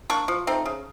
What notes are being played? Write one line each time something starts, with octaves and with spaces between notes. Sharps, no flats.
A#3 D4 C#6
F3
A3 C4 D#4
C#3